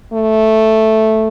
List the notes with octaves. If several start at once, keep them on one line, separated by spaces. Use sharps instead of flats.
A3